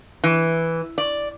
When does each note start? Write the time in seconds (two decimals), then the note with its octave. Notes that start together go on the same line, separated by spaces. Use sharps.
0.24 E3
0.98 D5